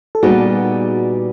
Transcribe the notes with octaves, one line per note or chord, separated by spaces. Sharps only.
A4
A#2 G3 B3 D#4 F#4 G#4